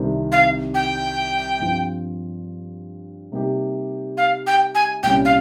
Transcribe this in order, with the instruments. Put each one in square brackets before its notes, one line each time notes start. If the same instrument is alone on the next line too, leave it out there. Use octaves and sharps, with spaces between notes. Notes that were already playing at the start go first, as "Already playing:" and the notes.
Already playing: [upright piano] C2 C3 D#3 G3 C4
[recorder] F5
G5
[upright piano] G2 F3 C4 F4
C3 G3 A#3 D#4 G4
[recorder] F5
G5
G#5
[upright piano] C2 A#2 G3 C#4 [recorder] G5
[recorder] F5